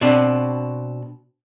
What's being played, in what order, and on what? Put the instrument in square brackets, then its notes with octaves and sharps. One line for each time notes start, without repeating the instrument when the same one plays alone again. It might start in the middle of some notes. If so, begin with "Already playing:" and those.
[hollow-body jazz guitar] B2 C4 D4